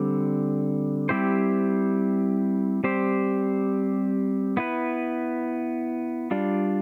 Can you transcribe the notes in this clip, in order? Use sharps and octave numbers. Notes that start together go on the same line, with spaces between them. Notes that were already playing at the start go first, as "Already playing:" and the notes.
Already playing: D3 G3 C4
G3 C4 E4 G4 C5
G3 C4 G4 C5
B3 E4 B4
G3 D4 F4